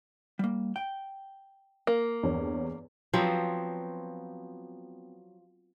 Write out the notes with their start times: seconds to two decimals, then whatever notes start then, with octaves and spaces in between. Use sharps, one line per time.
0.39 G3 A#3
0.76 G5
1.87 A#3
2.23 E2 G2 C#5
3.14 F3 F#3 B3 C4